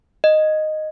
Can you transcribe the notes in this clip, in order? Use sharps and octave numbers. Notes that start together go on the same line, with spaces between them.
D#5